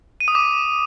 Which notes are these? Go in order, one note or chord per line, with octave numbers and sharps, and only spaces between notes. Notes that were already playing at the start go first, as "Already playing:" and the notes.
D#7
D#6
D6